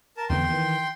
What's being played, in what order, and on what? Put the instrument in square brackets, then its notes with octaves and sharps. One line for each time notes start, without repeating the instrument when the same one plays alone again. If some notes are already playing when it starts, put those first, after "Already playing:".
[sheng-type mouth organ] A#4 A5
[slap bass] E2 D3 B3 [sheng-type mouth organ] G5 C6
[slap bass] D#3 E3